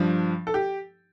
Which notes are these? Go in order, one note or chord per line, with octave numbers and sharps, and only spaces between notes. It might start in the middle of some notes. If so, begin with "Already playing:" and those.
Already playing: G2 F3 D4
A4
G4